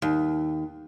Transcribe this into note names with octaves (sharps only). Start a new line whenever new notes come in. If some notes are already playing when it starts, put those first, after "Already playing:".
D#2